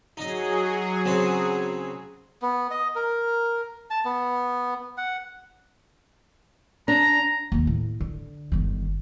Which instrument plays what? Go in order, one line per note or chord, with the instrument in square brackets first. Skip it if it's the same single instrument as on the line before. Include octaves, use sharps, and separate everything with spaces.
[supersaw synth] F#3 G#4 [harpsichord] D#4 D#5
[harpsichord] C#3 C4
[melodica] B3
D#5
A#4
A5
B3
F#5
[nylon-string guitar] D4 [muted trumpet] A#5
[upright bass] D#2 G#3
A2
D3
G1 D#3